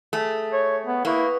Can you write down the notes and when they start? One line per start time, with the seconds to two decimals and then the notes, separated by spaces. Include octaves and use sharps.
0.13 A3 G#4 E5
0.53 C#5
0.86 B3
1.05 A#3 E4 B4 C#6 D#6